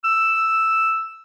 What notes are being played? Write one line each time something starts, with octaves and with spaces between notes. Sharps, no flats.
E6